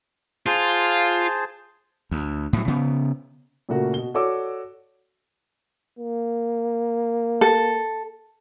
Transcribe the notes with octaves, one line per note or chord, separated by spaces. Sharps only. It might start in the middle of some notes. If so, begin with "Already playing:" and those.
F4 G#4 C5 A5
D2
A2 F#3
C#3 B3
A#2 C#3 A3 A#3 F#4
B2 G7
F#4 A4 C#5 D5 D6 E6
A#3
A4